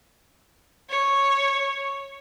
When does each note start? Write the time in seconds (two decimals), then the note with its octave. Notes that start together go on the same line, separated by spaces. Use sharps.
0.89 C#5